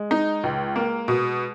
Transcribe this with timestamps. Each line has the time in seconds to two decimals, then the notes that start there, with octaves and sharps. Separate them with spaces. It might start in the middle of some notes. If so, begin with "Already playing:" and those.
Already playing: G#3
0.11 D#4
0.44 C#2
0.76 A#3
1.08 B2